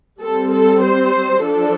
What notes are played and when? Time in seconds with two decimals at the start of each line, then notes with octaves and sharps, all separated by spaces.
0.21 G3 C4 A4
0.53 A4
0.84 C5
1.45 F3 D4 A4